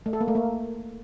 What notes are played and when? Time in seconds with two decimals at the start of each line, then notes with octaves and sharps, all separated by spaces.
0.06 A3
0.13 A4
0.21 A#3
0.28 A3
0.35 A#3